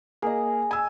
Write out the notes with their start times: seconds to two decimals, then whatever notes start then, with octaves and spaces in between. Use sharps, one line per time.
0.22 A#3 G#4 D#5
0.71 G#5 E6